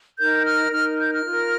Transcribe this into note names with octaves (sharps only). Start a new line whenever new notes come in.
D#4 A#4 G6
F6
D#4 A#4 F6
G6
F6
F4 A#4